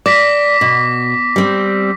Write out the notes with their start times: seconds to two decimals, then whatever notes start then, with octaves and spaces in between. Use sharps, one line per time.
0.06 D5 D6 A#6 B6
0.61 B2
1.36 G3 C4